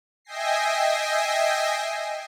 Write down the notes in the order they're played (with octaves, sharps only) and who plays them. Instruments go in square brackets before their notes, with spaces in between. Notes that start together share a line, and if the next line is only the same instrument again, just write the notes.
[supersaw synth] D#5 E5 G5 G#5 A#6 C7